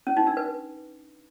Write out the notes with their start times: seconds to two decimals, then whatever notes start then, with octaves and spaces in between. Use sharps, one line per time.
0.07 C#4
0.17 D#4
0.27 D4
0.37 B4